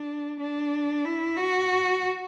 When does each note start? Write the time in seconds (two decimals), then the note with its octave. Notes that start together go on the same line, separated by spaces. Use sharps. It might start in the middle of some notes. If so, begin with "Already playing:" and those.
Already playing: D4
0.40 D4
1.05 E4
1.37 F#4